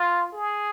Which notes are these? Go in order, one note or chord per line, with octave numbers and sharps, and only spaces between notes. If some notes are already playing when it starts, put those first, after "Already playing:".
Already playing: F4
G#4